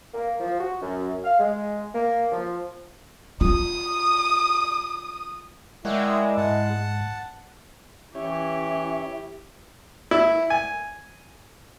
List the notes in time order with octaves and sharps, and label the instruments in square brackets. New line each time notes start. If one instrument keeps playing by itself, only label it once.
[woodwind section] A#3
F3
F#4
F#2
F5
G#3
A#3
F3
[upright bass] F4 [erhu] D#6
[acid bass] G#3 [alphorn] E4 [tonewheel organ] A#4 D5 E5 [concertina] C#5 F#5 G5
[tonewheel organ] G#2 [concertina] F#5 A5
[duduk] E3 [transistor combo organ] C#4 C#5 [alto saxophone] E4 [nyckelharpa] G4
[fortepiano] E4
G#5